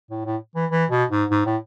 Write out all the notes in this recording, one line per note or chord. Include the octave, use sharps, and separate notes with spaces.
A2
A2
E3
E3
B2
G#2
G#2
A2